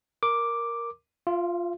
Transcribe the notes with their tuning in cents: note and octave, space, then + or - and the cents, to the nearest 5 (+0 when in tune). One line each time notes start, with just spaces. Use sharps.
A#4 +0 D6 +0
F4 +0 F5 -45